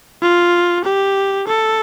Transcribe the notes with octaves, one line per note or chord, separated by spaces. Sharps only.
F4
G4
A4